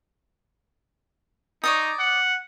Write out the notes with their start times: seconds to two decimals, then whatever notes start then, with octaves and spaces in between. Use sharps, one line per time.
1.64 D#4 C#5 D5 D#6
1.99 F#5